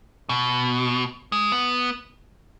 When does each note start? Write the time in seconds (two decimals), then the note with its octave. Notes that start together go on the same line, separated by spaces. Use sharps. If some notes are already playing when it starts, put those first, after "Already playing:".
0.29 B2
1.32 G#3
1.52 B3